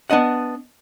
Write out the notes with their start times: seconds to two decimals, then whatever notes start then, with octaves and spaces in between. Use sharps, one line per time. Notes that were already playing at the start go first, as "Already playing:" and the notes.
0.10 B3 D4 D#5 F#5